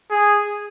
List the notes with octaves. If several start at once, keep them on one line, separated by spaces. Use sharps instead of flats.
G#4